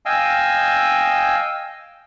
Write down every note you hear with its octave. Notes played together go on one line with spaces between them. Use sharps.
D#5 F5 G5 G#5 E6